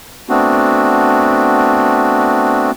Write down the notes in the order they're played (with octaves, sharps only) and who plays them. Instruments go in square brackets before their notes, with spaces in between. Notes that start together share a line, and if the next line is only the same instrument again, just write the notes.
[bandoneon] A3 B3 C4 D4 F#4